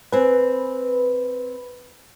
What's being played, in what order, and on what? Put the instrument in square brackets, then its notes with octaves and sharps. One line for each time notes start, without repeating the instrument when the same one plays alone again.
[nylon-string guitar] C4 G#5 [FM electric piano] B4